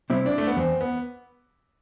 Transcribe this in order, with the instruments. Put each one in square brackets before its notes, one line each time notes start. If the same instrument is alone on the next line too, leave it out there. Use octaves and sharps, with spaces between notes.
[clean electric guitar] C3 G3 C4 E4
[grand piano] D4
A3
B3
[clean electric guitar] E2 [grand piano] C4
[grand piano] B3